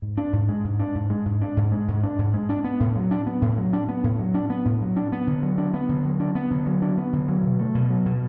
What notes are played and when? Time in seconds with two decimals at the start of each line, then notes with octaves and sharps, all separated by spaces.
0.02 G#2
0.17 D4
0.33 G#2
0.49 G#3
0.64 G#2
0.80 D4
0.95 G#2
1.10 G#3
1.26 G#2
1.42 D4
1.57 G#2
1.72 G#3
1.88 G#2
2.03 D4
2.19 G#2
2.34 G#3
2.49 D4
2.64 B3
2.80 A2
2.96 F#3
3.11 D4
3.27 B3
3.42 A2
3.58 F#3
3.73 D4
3.89 B3
4.04 A2
4.19 F#3
4.34 D4
4.50 B3
4.65 A2
4.81 F#3
4.96 D4
5.12 B3
5.27 D3
5.43 F#3
5.58 D4
5.74 B3
5.89 D3
6.05 F#3
6.20 D4
6.35 B3
6.51 D3
6.66 F#3
6.82 D4
6.98 B3
7.13 D3
7.28 F#3
7.43 B2
7.59 A3
7.75 B2
7.90 F#3
8.06 B2